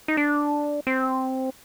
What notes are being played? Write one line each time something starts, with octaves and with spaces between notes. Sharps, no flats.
D#4
D4
C4